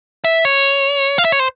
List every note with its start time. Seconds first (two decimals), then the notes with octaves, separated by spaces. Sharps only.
0.24 E5
0.45 C#5
1.18 F5
1.25 E5
1.32 C#5
1.39 C5